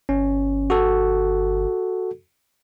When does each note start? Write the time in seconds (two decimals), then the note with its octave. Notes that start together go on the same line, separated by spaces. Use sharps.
0.09 G1 C#4
0.70 F#4 A4